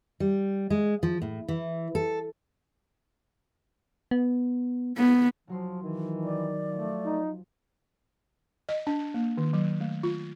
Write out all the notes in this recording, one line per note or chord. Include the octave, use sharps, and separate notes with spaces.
G3
G#3
F3
A2
E3
A4
B3
B3
F1 F3 F#3 C6
D#3 E3
D5
F3 A3
D#4
D#5
D4
A#3
D#3
F#3
A3
F4